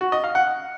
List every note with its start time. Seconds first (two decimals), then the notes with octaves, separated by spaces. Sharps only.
0.01 F#4
0.12 D#5
0.24 F5
0.35 F#5